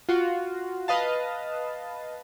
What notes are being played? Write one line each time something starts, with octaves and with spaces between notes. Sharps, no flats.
F4 F#4
B4 D#5 F5 A5